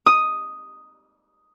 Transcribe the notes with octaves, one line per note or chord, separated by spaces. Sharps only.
D#6